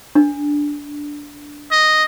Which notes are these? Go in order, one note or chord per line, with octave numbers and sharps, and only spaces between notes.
D4
D#5